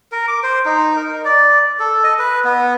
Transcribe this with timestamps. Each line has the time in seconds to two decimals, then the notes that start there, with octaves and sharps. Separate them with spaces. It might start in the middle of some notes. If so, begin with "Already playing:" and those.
0.12 A#4
0.28 D6
0.43 C5
0.65 D#4
0.96 A#4
1.25 D5
1.79 A4
2.04 D#5
2.19 B4
2.44 B3